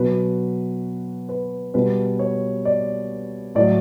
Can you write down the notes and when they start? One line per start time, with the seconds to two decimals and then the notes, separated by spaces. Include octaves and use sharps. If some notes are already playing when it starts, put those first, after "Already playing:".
Already playing: B2 F#3 B4
1.29 B4
1.74 B2 G3 B4
2.19 C#5
2.65 D5
3.55 A2 F#3 D5